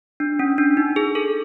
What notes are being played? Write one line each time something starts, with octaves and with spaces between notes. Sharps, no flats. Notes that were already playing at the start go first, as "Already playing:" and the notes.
D4
C#4
D4
D#4
G#4
A4